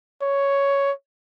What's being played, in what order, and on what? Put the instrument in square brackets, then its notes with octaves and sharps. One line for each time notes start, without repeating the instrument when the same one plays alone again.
[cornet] C#5